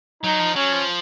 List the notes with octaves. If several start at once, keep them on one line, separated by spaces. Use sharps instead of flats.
F#3 D#4
F3
F#3 C#4
F3